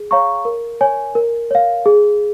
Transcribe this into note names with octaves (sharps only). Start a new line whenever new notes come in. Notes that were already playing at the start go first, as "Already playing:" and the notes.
Already playing: G#4
C#5 F5 A#5 C#6
A#4
C#5 G#5
A#4
C#5 F5
G#4